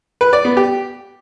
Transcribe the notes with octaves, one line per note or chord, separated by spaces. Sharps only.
B4
D5
B3
G4